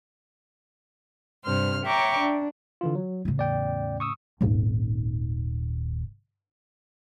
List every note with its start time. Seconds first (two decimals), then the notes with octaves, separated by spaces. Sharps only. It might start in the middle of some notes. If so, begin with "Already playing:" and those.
1.43 G2 C3 C5 F6
1.84 C#5 E5 G5 A#5 C#6 D6
2.17 D4
2.81 D3 E3 F4
2.95 F#3
3.25 A2 C#3
3.38 E2 D5 G5
4.00 C#6 D#6 E6
4.41 D#1 G#1